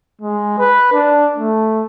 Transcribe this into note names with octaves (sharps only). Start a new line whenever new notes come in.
G#3
B4
D4
A3